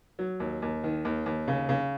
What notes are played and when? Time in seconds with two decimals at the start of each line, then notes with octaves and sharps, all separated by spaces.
0.19 F#3
0.40 D#2
0.62 D#2
0.84 D#3
1.05 D#2
1.26 D#2
1.48 C#3
1.69 C#3